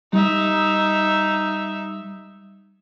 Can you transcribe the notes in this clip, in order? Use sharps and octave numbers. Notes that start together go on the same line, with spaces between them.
G3 D#4 E5